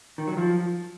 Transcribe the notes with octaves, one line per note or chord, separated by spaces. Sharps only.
D#3
F#3
F3